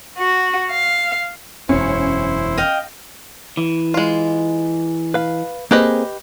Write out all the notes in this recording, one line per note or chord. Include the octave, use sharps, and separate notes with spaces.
F#4
F5
E1 F#2 C#4 E4 C5
D#5 F5 G5
E3
G#3 F4
B4 F5
A#3 C4 G4 G#4 B4 D#5